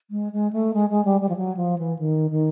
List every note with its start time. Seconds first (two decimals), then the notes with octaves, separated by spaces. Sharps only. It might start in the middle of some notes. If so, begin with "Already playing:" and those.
0.10 G#3
0.32 G#3
0.52 A3
0.74 G#3
0.90 G#3
1.05 G3
1.21 G3
1.29 F3
1.36 F#3
1.57 F3
1.78 E3
1.98 D#3
2.30 D#3